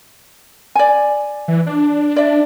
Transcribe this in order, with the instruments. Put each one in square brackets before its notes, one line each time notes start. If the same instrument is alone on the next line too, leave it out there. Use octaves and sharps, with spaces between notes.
[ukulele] D5 G#5
[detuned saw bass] E3
D4
[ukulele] D5 E5